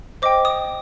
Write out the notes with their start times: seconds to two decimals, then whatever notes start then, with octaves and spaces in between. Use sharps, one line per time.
0.22 C5 D#5 G5 D6
0.45 D#6